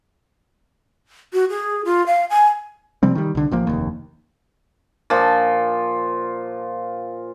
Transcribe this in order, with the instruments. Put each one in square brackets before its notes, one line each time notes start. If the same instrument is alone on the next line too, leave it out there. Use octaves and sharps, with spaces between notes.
[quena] F#4
G#4
F4
F5
G#5
[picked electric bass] C3 F3 G3 C4
D#3 G3
C2 D3
A1 F3 A#3
F1 D#2
[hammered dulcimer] A#2 F3